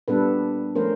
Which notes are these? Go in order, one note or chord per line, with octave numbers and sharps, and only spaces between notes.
A#2 G3 B3 D4 A4 B4
F3 A3 C#4 A#4 C5